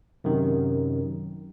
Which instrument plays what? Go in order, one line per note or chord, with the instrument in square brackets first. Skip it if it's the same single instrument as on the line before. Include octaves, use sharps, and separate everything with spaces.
[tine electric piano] F#2 C3 D#3